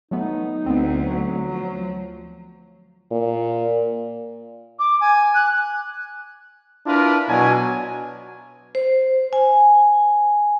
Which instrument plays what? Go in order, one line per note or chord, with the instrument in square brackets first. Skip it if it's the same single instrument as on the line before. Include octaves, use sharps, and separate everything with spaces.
[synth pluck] F#3 A3 B3 [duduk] D#4
[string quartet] D2 [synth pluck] B3 C4
[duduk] F#3
[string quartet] F3
[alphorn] A#2
[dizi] D6
G#5
F#6
[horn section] D4 E4 F4 A#4 B4
B2 F#3 D4 G#5
[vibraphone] C5
G#5